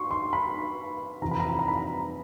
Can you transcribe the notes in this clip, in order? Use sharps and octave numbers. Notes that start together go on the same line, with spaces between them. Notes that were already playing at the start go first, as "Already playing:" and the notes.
Already playing: C6 C#6
C6
B5
F2 C3 E3 A#5
B5
A#5
B5
A#5
B5
A#5